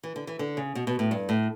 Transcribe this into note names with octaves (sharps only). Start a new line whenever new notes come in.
E3
D3
E3
D3
C#3
B2
B2
A2
G2
A2